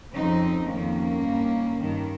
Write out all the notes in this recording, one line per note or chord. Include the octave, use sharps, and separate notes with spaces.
F2 C#3 C4 D#4
F2 D#3 A#3 C#4
G2 D#3
G2 D#3